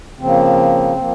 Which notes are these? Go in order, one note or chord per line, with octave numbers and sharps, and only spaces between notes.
C#3 F3 A#3 C4
F3 A#3